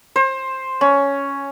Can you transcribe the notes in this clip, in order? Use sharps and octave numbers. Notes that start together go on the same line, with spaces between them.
C5
C#4